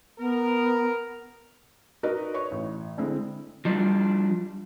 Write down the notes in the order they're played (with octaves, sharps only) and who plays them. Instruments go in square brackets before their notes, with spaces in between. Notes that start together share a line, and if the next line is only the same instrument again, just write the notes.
[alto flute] B3 [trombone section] A#4
[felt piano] D#4 F#4 A#4 B4 D5 D#5
B4 C#5 C#6
A1
D3 G#3 C4 E4
[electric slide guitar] F3 G3 D4